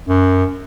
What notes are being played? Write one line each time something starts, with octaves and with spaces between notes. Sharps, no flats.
F#2